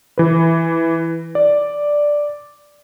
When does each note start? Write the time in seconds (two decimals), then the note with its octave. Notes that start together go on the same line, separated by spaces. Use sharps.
0.18 E3 B4
1.35 D5